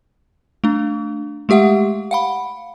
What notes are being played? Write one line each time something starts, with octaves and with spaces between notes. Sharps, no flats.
A3 D4
G#3 A3 G4 E5 F#5
F5 F#5 B5